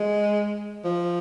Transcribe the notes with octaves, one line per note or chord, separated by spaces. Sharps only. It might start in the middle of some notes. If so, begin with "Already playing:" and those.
Already playing: G#3
F3